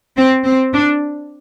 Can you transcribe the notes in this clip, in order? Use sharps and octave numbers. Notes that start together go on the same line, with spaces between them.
C4
C4
D4